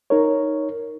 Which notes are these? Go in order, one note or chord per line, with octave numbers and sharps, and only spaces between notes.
D#4 A#4 C#5